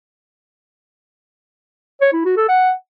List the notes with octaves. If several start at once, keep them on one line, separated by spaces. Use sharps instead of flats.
C#5
E4
F#4
A4
F#5